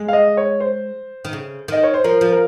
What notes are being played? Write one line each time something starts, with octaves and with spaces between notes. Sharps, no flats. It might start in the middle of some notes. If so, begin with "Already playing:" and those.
Already playing: G#3
F5
D#5
C#5
C5
D#3
C#3
D#3 D#5
C#5
C5
F3 A#4
F3
A#4